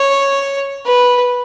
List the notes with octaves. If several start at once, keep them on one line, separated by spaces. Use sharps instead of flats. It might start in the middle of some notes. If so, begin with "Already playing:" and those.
Already playing: C#5
B4